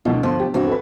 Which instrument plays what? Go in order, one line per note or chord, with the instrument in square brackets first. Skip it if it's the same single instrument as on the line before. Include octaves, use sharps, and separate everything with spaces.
[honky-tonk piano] D2 E3 F4 [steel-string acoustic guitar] B2
[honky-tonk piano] G1 C6 [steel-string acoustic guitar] F3
[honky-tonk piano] G4
[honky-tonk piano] G2 [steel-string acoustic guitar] E3 C4 F#4
[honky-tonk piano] A4 B4